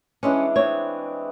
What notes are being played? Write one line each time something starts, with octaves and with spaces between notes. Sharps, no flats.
E3 G#3 C#4 D4
C4 C#5